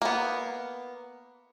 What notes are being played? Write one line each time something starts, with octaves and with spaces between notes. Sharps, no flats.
A#3 B3